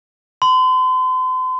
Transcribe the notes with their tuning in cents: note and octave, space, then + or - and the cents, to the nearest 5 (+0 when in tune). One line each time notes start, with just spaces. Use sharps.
C6 -40